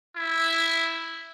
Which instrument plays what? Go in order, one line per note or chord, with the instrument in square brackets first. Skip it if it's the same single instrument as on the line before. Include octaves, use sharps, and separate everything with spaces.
[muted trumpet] E4